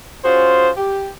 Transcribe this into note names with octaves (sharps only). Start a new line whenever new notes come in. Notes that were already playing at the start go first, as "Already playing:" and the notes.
C#4 F4 F#4 G#4 C5
G4